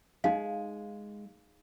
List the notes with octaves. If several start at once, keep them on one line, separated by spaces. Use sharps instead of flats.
G#3 D#4 F5